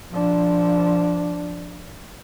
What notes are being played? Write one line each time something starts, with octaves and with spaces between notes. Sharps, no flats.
F3 D4